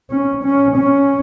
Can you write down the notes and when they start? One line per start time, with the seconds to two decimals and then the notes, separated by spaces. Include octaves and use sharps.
0.10 C#4
0.44 C#4
0.77 C#4